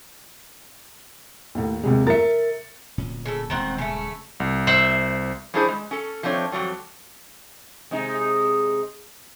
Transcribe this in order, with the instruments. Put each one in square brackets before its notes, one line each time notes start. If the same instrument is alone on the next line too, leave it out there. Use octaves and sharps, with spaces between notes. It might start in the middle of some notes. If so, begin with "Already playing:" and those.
[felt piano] D#2 A2
D#2 C3 G#3
[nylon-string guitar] A#4 E5 [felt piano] A6 C#7
[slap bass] D1 A#2 C#4
[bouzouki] C#3 A4
[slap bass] D#1 C#2 [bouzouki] D#3 C4 F#5
[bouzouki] C#3 A3
[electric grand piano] C2
[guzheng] C5 E5 F#5
[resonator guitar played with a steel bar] G3 C#4 D4 E4 G#4 C5
G#3
C#4 A4
F3 A3 C4 D4 C#5
F2 B2 F#3 G3
[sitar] C3 G#3 D#4